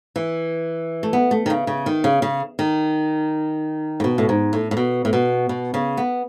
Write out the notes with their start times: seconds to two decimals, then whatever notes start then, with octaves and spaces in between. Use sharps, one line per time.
0.16 E3
1.03 A3
1.13 B3
1.31 A3
1.46 D#3
1.50 C#3
1.67 C#3
1.86 D#3
2.04 C#3
2.22 C#3
2.59 D#3
4.00 A2
4.04 B2
4.18 A2
4.29 G#2
4.53 A2
4.71 A2
4.77 B2
5.05 A2
5.13 B2
5.49 B2
5.74 C#3
5.97 B3